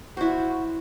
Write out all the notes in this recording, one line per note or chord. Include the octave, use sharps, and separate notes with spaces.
E4 F#4 C5